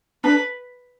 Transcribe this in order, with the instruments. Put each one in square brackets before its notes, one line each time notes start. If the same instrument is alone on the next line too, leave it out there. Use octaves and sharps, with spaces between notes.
[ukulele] D4 [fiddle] B4